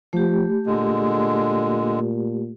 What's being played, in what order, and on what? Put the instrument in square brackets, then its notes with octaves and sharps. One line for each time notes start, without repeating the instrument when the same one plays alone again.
[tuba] F3 [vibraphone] A3 G4
[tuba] A#2 [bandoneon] D3 G#3